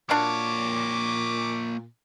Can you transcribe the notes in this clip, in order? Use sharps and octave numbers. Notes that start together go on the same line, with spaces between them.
A#2 A#3 D4 F#4 C#5 F5 D6